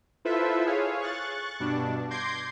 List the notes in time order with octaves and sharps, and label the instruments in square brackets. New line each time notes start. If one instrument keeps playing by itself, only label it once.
[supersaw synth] E4 F4 A4 B4 C5 E5
G#4 C#5 F5
C#6 F#6 A6
G2 B2 D4
C6 D6 G6 G#6 A#6 C7